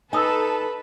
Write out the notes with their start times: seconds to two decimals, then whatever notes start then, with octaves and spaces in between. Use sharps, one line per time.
0.13 D#4 A4 B4 G#5 D#6 E6